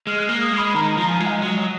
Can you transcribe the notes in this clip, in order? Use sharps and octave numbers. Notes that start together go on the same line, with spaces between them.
G#3 F6
F#6
F6
A#3
D#6
G#3 B5
D#3 A#5
A#5
F3
G#5
G#3
D#5
F#3